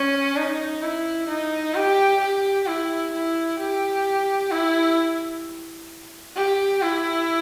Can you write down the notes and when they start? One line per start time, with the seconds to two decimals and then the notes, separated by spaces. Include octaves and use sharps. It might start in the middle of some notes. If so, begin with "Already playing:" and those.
Already playing: C#4
0.36 D#4
0.82 E4
1.28 D#4
1.75 G4
2.21 G4
2.67 E4
3.13 E4
3.59 G4
4.51 E4
6.36 G4
6.82 E4